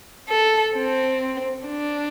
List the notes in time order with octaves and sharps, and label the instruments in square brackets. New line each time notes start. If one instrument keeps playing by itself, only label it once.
[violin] A4
C4
D4